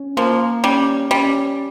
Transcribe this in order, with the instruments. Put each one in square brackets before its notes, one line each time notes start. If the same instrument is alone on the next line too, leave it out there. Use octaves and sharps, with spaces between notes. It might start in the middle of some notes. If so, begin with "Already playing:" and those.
Already playing: [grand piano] C#4
[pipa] F3 [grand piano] A#3
[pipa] G3 [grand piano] C#4
[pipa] G3 [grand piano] C#4